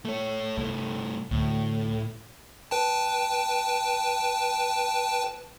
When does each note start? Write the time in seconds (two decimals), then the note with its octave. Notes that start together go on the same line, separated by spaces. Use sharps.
0.05 A3 C#5
0.57 G2 C3 A3
1.31 D2 A2
2.71 B4 G5 A5